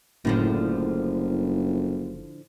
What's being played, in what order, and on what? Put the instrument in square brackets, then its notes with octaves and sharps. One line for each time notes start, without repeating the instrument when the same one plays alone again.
[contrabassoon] F#1 [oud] A2 D3 F3